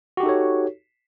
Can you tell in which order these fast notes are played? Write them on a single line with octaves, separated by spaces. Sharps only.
F#4 G4 D#4 A4 C#5